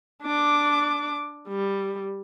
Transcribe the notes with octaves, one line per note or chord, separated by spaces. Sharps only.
D4 D6
G3